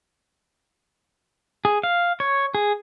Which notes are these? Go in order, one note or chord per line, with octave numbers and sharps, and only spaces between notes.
G#4
F5
C#5
G#4